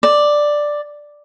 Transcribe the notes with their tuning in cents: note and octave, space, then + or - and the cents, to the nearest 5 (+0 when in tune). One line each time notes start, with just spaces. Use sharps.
D5 +5